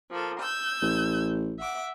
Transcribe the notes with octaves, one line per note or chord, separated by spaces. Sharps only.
F3 A#3 A4
E6 G6 G#6
A1
E5 F#5 D6